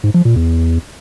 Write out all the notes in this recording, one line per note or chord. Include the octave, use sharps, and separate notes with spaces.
G#2
F3
A#2
E2